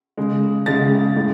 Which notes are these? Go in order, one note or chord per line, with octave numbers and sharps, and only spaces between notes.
C#3 G#3
C#3 G#3 A6
A2 G#3